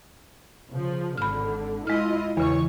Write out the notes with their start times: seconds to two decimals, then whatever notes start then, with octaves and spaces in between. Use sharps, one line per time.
0.71 C#3 F3
1.18 G#1 D3 B5 F6
1.87 G#3 E4 F4 D#5 F6
2.37 E2 C#3 E3 C#5 C#6